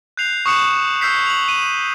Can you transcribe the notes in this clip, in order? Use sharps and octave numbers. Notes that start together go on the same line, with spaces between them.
F#6 G6 C7 F7
C#6 D#6 F#6 C#7 E7
E6 G6 B6 C7
F7 F#7
D#7